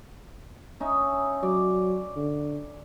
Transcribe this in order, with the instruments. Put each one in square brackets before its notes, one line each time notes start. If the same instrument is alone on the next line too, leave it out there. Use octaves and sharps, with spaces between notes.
[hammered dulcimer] C#4 D#4 E5
[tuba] F#3 [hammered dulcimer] D5
[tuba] D3